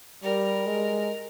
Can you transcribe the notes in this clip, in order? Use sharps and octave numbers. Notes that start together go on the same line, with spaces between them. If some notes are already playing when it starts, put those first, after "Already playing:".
G3 A#4
G#3